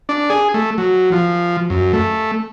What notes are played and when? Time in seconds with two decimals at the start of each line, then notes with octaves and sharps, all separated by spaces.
0.09 D4
0.30 G#4
0.54 A3
0.78 F#3
1.12 F3
1.70 F#2
1.93 A3